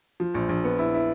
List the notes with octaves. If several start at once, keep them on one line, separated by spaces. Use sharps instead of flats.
F3
A#1
A#1
B3
E4
E4